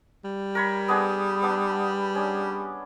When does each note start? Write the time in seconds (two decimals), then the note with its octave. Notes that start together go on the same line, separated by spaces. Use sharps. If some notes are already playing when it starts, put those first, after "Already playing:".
0.24 G3
0.55 A#4 C#5 B5
0.88 B3 D4 G#4
1.42 B3 D4
2.15 C#4 D4